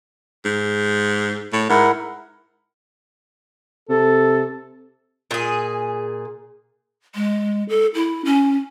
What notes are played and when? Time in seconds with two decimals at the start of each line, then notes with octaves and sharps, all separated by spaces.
0.45 G#2
1.53 A2
1.70 G#2 E4 A#4 F#5
3.89 C3 A4
5.31 A#2 G#4
7.15 G#3
7.69 A4
7.94 E4
8.25 C#4